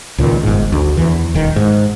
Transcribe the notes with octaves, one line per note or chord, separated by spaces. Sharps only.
C#2 A#2 D#3
G1 G#2
D2
E2 E3
D#1 D#3
G#2